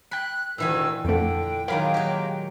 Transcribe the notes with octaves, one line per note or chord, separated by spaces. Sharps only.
G5 B5 F#6 B6
D2 A#2 D#3 E3 G#5 E6
F2 D3 A3 G5
D#3 F#3 G#3 A#3 G#4 A#4 F5 B5
F#3 G4